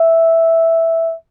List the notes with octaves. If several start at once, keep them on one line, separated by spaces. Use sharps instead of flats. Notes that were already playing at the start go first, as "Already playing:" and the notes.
Already playing: E5